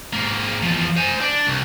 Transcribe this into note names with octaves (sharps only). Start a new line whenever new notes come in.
G#2 A#3
E2 F3
C5 G#5
D4 D5
C2